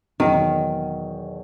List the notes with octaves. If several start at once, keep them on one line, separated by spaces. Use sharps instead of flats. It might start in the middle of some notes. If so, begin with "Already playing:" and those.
E2 B2 D#3 F#3